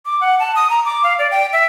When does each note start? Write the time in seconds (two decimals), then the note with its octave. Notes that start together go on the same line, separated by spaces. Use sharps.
0.06 D6
0.21 F#5
0.39 A5
0.56 D#6
0.70 A#5
0.85 D6
1.04 F5
1.19 D5
1.31 G5
1.53 E5